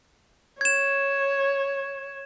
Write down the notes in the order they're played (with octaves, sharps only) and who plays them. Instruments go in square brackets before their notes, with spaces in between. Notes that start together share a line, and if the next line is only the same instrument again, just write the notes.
[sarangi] C#5 [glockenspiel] G#6 E7